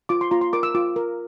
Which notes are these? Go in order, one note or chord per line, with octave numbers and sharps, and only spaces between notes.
F4 D6
C6
F4 A#5
C6
A#4 D6
E6
F4 D6
A#4